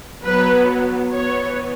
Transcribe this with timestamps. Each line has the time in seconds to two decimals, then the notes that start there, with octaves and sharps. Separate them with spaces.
0.25 F#3 B3 B4
1.13 E3 B3 C#5